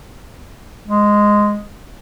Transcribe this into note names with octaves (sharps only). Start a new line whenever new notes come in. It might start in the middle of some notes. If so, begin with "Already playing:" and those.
G#3